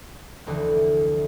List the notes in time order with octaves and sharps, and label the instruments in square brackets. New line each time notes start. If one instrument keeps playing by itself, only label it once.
[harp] F1 D2 D3 E3 G4 D5